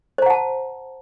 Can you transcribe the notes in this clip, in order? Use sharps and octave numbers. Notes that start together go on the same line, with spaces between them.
C5 F#5 A5 A#5